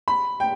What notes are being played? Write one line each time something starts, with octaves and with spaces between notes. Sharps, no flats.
B5
G5